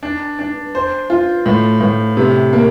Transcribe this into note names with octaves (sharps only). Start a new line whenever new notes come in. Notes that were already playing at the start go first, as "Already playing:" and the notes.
D4
D4
C5
F4
A2
A2
C3
A#3